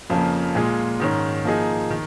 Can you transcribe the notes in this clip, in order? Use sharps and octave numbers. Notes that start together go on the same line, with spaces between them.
F2 C#3 F3 A#3
A#2 G#3 F4 G#4
G#2 D#3 C#4
F3 A#3 D#4 G#4
D#3